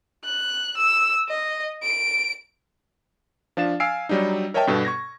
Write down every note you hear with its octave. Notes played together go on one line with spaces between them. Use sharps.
F#6
E6
D#5
D7
F3 D4 F5 A6 E7
F5 G#5 E6 F6 C7 D7
F#3 G3 D4 D#4
A#4 C#5 D#5 E5 G5 A5
G2 B2 A4
C#6 G#6 A#6